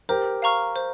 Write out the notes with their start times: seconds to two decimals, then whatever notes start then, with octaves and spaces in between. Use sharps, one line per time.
0.09 G4 A#4 C5
0.42 F5 A#5 C#6 F6
0.76 C5